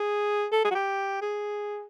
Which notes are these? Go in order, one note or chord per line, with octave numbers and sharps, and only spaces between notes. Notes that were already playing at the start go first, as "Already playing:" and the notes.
Already playing: G#4
A4
G#4
F#4
G4
G#4